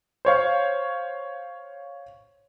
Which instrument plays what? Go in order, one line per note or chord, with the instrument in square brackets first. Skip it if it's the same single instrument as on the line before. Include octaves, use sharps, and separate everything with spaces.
[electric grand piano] C5 C#5 F5